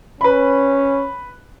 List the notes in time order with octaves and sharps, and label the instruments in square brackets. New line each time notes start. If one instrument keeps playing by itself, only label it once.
[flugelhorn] C#4 [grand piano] B4 B5